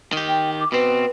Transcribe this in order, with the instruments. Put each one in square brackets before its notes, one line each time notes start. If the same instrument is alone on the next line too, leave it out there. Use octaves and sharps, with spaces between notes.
[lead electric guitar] D#3 G4
[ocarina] G5
D6
[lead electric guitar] B2 C4 [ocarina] B4